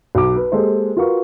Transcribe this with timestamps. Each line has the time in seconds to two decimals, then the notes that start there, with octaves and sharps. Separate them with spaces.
0.15 B1 D6
0.36 B4
0.52 G#3 A#3 G4 A4 C5
0.97 F4 F#4 A#4 B4 F5 C#6